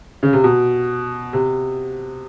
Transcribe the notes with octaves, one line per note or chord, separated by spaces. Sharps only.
C#3
C3
B2
C3